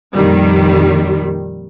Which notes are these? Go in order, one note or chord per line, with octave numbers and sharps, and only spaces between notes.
F2 A#2 D#3 G3